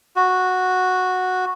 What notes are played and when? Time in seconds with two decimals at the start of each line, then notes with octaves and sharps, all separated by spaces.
0.16 F#4